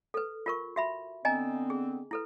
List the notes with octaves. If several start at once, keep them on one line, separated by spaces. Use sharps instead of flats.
A4 B4
F4 A#4 C#6
F#4 E5 B5
D3 B3 C4 D#5 G#5 A#5
G#4
E4 A4 B4